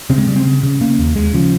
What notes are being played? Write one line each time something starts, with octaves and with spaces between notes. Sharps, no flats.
C#3 C4
G#3
C#3 G3
C4
C#3
C#3
C#3 A#3
D#2
D#2 G#3
C#3 F3